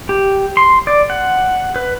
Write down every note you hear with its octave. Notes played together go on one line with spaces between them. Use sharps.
G4
C6
D5
F#5
B4